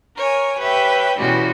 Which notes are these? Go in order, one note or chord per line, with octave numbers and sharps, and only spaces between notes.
A#4 C#5 G#5
G4 B4 C#5 E5 G5
B2 E3 G3 G#3 C#4 F#4